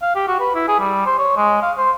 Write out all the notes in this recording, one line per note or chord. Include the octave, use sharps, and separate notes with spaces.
F5
G4
F#4
B4
E4
G#4
G3
C5
C#5
G#3
F5
C5